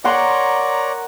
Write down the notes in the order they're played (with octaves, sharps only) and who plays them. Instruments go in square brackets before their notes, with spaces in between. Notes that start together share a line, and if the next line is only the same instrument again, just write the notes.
[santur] A#4 F#5 C6 [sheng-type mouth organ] C#5 D5 A#5